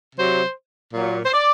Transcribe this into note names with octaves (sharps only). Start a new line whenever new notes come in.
C3 F#3 C5
A#2 F#3
C5
D5